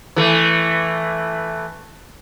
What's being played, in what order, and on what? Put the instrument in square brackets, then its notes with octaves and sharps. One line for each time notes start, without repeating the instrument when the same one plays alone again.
[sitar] E3 A3